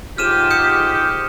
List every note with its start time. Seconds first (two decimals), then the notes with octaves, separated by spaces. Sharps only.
0.18 G#2 F4 G4 F6 D#7 E7
0.50 D#6 G6 C#7